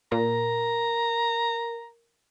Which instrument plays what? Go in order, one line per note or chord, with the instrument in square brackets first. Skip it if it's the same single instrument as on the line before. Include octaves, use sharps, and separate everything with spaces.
[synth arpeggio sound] A#2 [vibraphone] A#4 [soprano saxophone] A#5